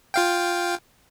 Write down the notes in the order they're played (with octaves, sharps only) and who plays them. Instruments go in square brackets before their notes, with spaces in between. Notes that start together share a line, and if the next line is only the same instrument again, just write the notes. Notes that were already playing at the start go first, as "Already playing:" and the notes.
[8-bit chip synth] F4 F5 G5